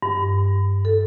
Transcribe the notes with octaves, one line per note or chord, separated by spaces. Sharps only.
G2
A4